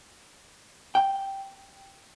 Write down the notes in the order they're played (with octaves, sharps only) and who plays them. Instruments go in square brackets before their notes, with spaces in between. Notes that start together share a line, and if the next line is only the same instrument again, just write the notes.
[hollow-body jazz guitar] G5